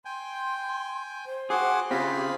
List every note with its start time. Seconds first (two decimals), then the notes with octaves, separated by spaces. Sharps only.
0.05 G5 G#5 C6
1.26 C5
1.50 F#4 G#4 F#5 C6 D6
1.91 C#3 C4 F4 G4 G#4 B5